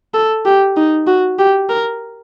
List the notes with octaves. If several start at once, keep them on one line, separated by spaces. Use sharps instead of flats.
A4
G4
D#4
F#4
G4
A#4